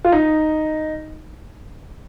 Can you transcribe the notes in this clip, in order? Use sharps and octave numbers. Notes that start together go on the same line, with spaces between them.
F4
D#4